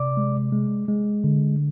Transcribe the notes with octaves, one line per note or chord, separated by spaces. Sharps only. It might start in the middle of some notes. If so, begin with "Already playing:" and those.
Already playing: C3 D5 D6
G#3
G#3
G#3
D3